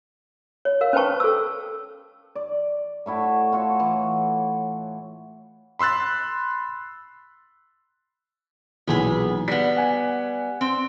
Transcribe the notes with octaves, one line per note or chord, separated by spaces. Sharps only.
C#5
A#4 F5
C#4 B4 C5 G5 A5 C#6
A4 E6
D5
A2 A3 E4 F#4
F4 F#4 A4 C#5
E3
B5 C6 E6 F#6 A6
B1 A#2 E3 B3 G#4 B4
G3 B3 B6
F#5 G#5
C4